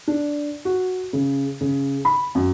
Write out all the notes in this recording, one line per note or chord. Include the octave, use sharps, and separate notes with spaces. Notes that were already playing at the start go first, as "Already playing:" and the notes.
D4
F#4
C#3
C#3
B5
F#2